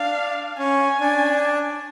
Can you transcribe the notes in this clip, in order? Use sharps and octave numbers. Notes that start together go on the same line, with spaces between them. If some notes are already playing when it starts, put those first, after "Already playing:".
Already playing: D4 F5
C#4 G#5
D4